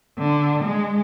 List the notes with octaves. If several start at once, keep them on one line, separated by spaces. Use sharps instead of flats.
D3
G#3